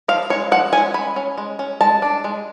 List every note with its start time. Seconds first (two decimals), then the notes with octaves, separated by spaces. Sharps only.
0.08 F3 F5
0.30 G#3 C#4 C#5
0.52 F3 F#5
0.73 G#3 C#4 G#5
0.94 G#3 B5
1.16 C#4
1.38 G#3
1.59 C#4
1.81 G#3 A5
2.02 D4
2.24 G#3